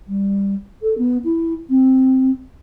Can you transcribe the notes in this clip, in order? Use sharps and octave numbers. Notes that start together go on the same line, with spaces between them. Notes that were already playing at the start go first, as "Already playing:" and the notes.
G3
A4
B3
E4
C4